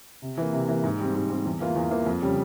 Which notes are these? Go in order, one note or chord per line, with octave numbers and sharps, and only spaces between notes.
C3
E3 A#3
C3
E3 A#3
G#2
G3 C4
G#2
G3 C4
E2
E3 A#3 F4
E2
E3 A#3 F4
F2
C#3 G3